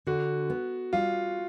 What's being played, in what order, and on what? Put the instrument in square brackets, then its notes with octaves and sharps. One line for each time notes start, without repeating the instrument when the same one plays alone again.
[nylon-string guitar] D3 [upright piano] F#4
[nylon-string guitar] B3
[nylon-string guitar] G3 [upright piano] F4